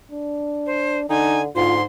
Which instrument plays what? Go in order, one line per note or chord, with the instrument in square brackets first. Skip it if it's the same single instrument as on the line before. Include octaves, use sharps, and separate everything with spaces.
[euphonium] D4
[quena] C5
[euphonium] D3 [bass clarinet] D#4 [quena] G#5
[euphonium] D2 [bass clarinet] G#2 [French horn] F4 [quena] C6